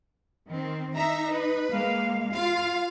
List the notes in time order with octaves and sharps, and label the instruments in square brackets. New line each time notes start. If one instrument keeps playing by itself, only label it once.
[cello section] D#3 C4
[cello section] D#4 [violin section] E5 A#5
[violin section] B4
[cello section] G#3 A#3 F5
[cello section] F4 [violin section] F5